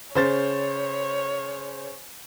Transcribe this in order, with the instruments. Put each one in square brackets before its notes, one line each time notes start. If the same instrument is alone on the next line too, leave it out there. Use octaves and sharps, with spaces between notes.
[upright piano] C#3 C5 A6 [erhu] C#5